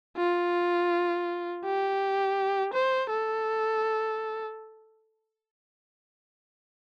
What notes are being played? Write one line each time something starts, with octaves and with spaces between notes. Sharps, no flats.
F4
G4
C5
A4